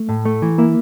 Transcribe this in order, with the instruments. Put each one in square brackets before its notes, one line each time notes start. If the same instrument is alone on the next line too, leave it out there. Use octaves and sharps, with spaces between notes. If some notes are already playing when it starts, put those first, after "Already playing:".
Already playing: [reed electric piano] A3
[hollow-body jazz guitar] A2
A3
E3
[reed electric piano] A#3 [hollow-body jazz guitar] E4